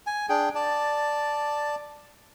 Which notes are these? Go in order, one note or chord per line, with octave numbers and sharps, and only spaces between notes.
G#5
D4 G#4 G5
D5 A5